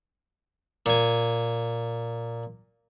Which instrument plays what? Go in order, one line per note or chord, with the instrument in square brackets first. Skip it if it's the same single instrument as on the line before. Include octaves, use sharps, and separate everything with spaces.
[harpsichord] A#2 G#5